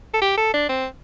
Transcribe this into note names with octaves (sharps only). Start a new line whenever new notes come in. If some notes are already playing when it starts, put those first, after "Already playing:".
A4
G4
A4
D4
C4